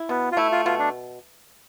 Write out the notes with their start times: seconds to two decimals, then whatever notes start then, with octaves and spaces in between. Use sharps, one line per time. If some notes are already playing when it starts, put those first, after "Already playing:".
Already playing: E4
0.09 B2 B3
0.32 F4
0.37 A3 E4
0.52 F4
0.65 B2 F4
0.79 D4